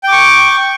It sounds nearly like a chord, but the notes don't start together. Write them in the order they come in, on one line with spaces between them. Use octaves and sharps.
G5 D6 C#6